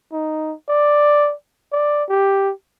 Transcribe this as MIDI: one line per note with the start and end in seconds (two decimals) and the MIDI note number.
0.13 0.54 63
0.69 1.33 74
1.72 2.04 74
2.10 2.52 67